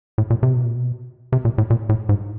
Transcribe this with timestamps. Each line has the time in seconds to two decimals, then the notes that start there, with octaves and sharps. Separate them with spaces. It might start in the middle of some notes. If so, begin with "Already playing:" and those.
0.18 A2
0.30 A#2
0.43 C3
0.54 B2
0.64 A#2
0.75 B2
1.32 C3
1.45 A#2
1.58 A2
1.70 A#2
1.89 A2
2.09 G#2